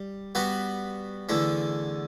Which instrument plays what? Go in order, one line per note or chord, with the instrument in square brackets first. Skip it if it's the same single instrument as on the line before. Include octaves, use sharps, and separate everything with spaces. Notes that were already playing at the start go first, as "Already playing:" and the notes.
Already playing: [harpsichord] G3
G3 B3 F#4 B4
E2 D3 A3